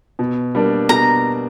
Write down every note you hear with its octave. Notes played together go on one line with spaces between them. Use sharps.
B2
G3 A#3 D4
B2 A#5